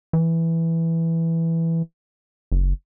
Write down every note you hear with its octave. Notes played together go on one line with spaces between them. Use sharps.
E3
F#1